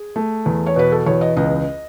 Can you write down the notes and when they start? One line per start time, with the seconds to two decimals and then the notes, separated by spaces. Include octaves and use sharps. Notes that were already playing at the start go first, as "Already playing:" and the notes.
Already playing: G#4
0.16 A3
0.46 E2
0.66 C#5
0.76 B2 B4
0.92 A4
1.06 E2 C#5
1.21 D#5
1.37 C#2 D#5